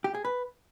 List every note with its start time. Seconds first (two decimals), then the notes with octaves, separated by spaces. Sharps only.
0.04 G4
0.14 G#4
0.25 B4